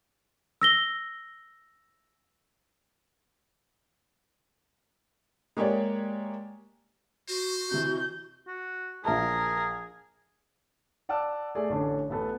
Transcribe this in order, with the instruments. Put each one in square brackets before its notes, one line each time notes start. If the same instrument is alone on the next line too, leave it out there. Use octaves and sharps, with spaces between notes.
[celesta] E6 A#6 G7
[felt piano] G#3 A#3 G4 C#5 D5
[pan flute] F#4 [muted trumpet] C5
[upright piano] C3 E3 [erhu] G6
[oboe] F#4
[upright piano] A#1 E5 A5 [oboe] G#4 [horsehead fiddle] A#4
[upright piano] D5 F#5 A5 D6 E6
A3 G#4 D5 G#5
A1 D3 C#4 D4 A4
A1 B3 A4 B4